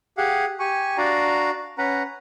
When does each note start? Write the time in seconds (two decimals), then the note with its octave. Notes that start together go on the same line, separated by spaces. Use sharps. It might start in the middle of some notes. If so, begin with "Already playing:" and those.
0.18 G4 G#4 F5 F#5
0.59 G4 G#5 C#6
0.98 D4 F#4 D5 F5 A#5
1.78 C#4 B4 F#5 A#5